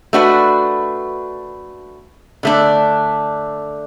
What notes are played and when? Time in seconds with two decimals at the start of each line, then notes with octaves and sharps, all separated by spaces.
0.13 A3 D4 F#4 B4
2.43 D3 A3 D4